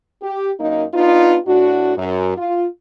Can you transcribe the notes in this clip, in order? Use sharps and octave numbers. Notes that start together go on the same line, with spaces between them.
G4
F#2 A#3 D#4
B3 D4 D#4 F4
A2 D4 F#4
F#2
F4